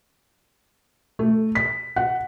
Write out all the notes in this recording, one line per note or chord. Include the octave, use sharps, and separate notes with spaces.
A3
B6
F#5